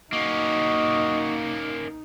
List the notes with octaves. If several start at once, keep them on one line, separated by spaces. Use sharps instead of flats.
A#3 C#4 D#4 F#4 D#5